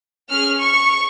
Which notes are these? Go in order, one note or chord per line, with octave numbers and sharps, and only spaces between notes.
C#4 G#4 F6
C#6